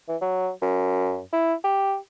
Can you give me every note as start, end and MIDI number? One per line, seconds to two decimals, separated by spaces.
0.08 0.16 52
0.21 0.50 54
0.62 1.21 42
1.33 1.54 64
1.64 1.96 67